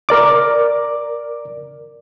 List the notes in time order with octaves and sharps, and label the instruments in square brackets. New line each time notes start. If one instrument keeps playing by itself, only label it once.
[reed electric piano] A#4 D5 D6